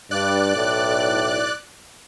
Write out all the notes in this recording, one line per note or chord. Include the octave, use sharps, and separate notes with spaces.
G2 D5 F#6
B1 A2